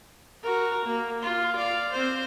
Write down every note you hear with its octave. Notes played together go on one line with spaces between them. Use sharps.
F#4 A#4
A#3
F4
D5 F5
C4 C5